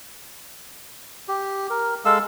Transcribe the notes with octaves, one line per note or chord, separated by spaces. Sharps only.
G4
A#4
G#3 A4 F5 E6